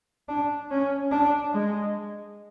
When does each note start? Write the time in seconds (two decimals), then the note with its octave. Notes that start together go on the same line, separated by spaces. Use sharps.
0.29 D4
0.71 C#4
1.11 D4
1.54 G#3